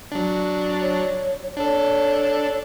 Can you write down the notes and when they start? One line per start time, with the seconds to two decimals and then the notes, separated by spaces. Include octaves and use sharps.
0.12 F#3 D4
0.82 C#5
1.57 D4 A4 C#5